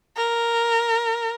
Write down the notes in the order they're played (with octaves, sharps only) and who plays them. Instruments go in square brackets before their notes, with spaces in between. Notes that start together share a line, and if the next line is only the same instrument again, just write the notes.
[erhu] A#4